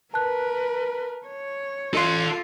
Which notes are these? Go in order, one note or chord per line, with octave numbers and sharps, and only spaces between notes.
A#4 B4 A5 F#6
C#5
F4 A4 C6